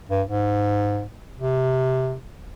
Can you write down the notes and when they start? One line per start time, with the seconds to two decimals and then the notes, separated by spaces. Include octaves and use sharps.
0.09 G2
0.28 G#2
1.39 C3